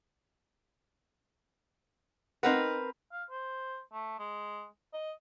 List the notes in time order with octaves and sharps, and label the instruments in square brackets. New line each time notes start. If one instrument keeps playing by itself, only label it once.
[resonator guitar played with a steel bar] C4 A#4 B4 [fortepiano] D#4 F#5
[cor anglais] F5
C5
A3
G#3
D#5